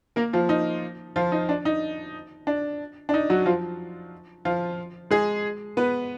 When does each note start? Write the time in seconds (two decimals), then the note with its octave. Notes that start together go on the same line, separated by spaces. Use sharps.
0.16 A#3 A#4
0.33 F3 F4
0.49 D#4
1.16 F3 F4
1.32 D#4
1.49 D4
1.65 D#4
2.47 D4
3.09 D4
3.14 D#4
3.30 F#3 F#4
3.46 F3 F4
4.45 F3 F4
5.11 G#3 G#4
5.77 B3 B4